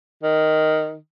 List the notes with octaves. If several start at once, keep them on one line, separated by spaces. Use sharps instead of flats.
D#3